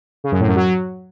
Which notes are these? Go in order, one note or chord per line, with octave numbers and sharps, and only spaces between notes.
C#3
F#2
A2
F#2
F#3